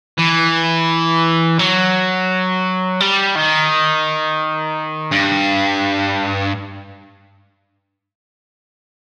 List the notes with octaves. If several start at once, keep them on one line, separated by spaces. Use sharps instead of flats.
E3
F#3
G3
D#3
G2